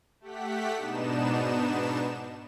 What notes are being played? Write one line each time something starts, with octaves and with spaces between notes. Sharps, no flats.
A3 G4 F#5 B6
G#2 B2 B3 D4 D#4 E7